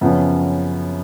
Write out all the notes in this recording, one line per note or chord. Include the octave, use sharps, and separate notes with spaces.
F#2 C#3 F3 B3